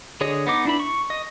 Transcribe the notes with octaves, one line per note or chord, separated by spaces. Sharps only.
D3 G#4 C#5 D#5
B3 D#4 D6
D4 E4 B5
C#6
D#5